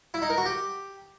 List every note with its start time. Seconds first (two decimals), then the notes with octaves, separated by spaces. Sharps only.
0.14 E4
0.22 D#4
0.30 A#4
0.38 F#4
0.45 G4